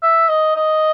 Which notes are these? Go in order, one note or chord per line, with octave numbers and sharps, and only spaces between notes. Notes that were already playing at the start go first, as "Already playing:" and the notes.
E5
D#5
D#5